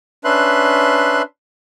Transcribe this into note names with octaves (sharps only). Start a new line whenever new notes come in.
C#4 D4 B4 E5 C6 F#6